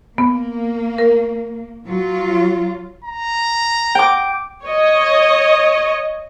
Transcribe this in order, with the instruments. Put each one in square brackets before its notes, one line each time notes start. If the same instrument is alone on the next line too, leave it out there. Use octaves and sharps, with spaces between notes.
[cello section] A#3 [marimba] B3
[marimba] A#4
[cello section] F#3 F4
[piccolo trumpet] A#5
[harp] G5 D6
[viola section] C#5 D#5